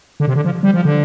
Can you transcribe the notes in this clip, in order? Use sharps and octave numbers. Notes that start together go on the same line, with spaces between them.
D3
C3
D3
F3
G3
F3
D3